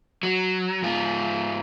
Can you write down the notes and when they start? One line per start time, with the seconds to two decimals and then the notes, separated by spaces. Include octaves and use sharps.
0.23 F#3
0.82 G#2 F4